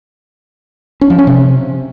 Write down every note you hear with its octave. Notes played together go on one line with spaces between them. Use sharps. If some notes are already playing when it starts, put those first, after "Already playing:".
C#4
F3
C#4
C3